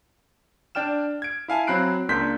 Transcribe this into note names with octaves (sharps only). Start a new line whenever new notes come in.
D4 D5 G5 F6 E7
G#6 D7
E4 F5 G#5 A5
F#3 C4 B5 F#6 C7 D7
C#2 A#3 D4 C6 G6 B6